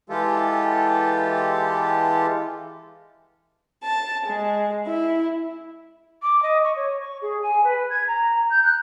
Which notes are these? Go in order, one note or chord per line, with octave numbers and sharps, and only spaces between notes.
E3 G#3 F4 G4 A4
A5
G#3
E4
D6
D#5
C#6
C#5
C#6
G#4
G#5
B4
G#6
A#5
G6
F#6